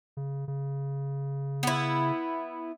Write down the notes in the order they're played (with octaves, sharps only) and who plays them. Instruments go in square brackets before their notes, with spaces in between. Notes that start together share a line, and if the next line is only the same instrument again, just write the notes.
[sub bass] C#3
C#3
[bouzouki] B3 E4